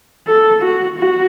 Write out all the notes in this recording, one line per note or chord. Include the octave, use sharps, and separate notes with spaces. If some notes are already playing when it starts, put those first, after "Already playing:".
A4
F#4
F#4